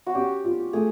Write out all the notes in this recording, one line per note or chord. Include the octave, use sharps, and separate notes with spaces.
F#4
C#4 G4
F4
A3 G#4